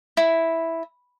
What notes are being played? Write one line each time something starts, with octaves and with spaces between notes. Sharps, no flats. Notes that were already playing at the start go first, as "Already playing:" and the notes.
E4